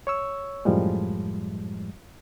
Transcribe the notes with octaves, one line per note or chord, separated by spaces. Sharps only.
C#5 C#6 E6
F#2 A2 F3 G3 G#3